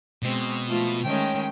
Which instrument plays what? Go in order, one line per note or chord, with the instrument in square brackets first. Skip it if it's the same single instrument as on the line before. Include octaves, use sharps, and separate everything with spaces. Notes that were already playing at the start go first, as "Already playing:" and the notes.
[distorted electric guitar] B2 [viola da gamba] G#3 C4
[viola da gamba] F3 A3 F4
[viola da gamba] D#3 G#3 A3 [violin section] C#4 G5